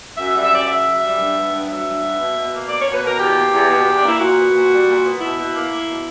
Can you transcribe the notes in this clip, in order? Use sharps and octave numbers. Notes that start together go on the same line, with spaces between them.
F#2 E5
E5
G3
E5
F#2 D5
C#3 E5
F#2
G3
G2
B3
G2
F#3 E5
G2
B3
B2
B2
A#3
A#3 D5
B2 C#5
B4
B2 A#4
E2 G4
A#3
E2
B2
E2
D4
A#3 E4
A#2 F#4
B3
A#2
G3
A#2
B3
B2 E4
B2
A#3
A#3
B2